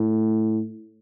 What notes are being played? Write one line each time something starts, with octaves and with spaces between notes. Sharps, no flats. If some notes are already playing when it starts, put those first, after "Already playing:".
Already playing: A2